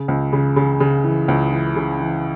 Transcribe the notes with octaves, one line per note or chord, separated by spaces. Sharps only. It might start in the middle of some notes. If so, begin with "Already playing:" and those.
Already playing: C#3
C#2
C#3
C#3
C#3
E3
C#2
E3
C#3
E3